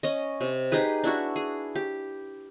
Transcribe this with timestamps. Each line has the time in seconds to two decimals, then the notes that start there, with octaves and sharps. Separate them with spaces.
0.03 C#4 D#5
0.41 C3
0.72 D#4 G4 G#4 B4
1.04 D4 E4 F#4
1.36 G#4
1.75 G4